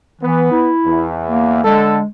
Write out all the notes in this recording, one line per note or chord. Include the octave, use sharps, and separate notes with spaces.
E3 B3
E4
E2
A#3
D3 G#3 A4